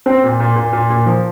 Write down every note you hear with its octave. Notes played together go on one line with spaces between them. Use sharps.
C4
A#2
A#2
A#2
A#2
A#2
F3